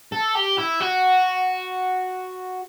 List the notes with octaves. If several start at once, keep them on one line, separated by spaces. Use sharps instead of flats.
A4
G4
E4
F#4